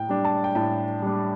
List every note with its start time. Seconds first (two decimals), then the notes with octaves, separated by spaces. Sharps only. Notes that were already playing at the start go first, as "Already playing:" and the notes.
Already playing: A2 G5
0.09 G3 D4
0.25 A5
0.44 G5
0.55 A2 A5
1.02 G3 D4